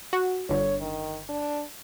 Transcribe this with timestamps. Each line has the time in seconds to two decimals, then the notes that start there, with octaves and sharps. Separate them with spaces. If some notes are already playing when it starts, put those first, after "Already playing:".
0.13 F#4
0.49 G1 D3 C#5
0.81 D#3
1.29 D4